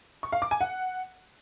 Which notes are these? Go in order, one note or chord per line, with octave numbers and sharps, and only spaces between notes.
C#6
F5
D6
G#5
F#5